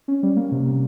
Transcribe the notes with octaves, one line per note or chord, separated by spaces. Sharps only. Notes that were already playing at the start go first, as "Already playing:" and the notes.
C#4
G3
A#3
C3
C3